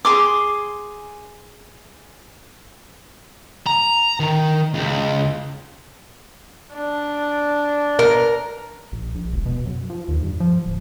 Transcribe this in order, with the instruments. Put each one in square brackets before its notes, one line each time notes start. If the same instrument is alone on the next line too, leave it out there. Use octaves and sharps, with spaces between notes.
[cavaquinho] G#4 C6 D6
[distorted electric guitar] A#5
D#3
C#2
[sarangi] D4
[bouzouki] A#4
[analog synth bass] A#1
A#1
E1
B2
F#2
F3
D#2
G2
F3
D1